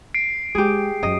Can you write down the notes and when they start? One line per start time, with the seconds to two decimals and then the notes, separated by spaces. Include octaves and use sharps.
0.14 C7 D7
0.55 G#3 G4 G#4
1.03 F#2 F#3 D#5